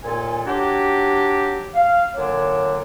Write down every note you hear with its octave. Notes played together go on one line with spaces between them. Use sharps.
D#2 A#2 A4 G#5
F#3 D4 G4
F5
A#2 D3 F#3 D4 C#5